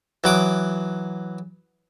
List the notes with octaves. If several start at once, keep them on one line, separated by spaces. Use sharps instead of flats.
E3 F#3 D6 D#6